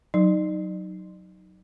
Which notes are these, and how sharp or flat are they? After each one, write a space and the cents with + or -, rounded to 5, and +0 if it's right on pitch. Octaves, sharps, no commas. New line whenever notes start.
F#3 +0 D#4 +0